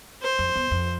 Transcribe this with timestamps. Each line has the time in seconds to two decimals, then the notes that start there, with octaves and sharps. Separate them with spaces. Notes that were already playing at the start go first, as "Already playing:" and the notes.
0.22 C5
0.39 F2
0.56 E2
0.71 F2